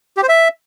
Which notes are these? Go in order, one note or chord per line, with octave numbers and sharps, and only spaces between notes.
G4
C5
E5